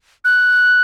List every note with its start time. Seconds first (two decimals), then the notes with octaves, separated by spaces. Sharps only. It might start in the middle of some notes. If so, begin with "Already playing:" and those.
0.25 F#6